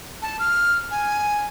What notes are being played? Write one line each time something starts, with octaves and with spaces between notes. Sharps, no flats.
A5
F6
G#5